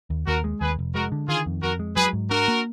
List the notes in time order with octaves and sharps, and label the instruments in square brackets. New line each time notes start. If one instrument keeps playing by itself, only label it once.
[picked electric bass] D#2
[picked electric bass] D#2 [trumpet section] F#4 A#4
[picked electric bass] G#3
[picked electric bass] D#2 [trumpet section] G#4 B4
[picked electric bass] F1
[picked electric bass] G#3 [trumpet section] F#4 A#4
[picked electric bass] D3
[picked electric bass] D#3 [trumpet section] F4 G#4
[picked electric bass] F2
[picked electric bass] F2 [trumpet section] F#4 A#4
[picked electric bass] G#3
[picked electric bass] F#3 [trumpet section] G#4 B4
[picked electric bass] G#2
[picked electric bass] D4 [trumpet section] F#4 A#4
[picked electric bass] A#3